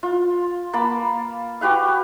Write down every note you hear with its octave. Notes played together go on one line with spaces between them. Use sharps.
F4
A#3 A5 B5
F#4 G4 B4 F5